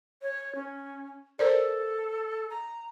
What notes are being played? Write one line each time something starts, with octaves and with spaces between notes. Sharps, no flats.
C#5
C#4
A4 A#4 C5 D5
A#5